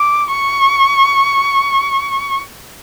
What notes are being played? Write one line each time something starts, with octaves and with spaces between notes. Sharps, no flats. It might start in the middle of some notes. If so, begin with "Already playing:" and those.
Already playing: D6
C#6